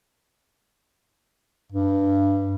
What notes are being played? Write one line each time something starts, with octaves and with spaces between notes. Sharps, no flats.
G2